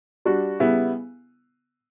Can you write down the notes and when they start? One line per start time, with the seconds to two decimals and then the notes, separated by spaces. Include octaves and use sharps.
0.25 G3 D4 F#4
0.60 C#3 G3 B3 E4